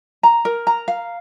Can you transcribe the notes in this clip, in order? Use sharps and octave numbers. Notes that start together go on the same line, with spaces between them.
A#5
A#4
A#5
F5